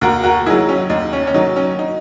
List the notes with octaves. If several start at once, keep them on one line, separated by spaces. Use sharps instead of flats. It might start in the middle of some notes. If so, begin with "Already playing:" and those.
D#2 F#4 A#4
F#4 A#4
D#3 F#3 E4 G#4
C#4
D#2 D#4
C#4
C#4
D#3 F#3 D#4
C#4
D#4